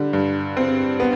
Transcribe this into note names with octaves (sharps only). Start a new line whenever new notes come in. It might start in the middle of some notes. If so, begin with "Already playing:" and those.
Already playing: D3 G3
G2
C4
B3